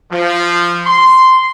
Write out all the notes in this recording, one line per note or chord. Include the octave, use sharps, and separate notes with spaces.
F3
C6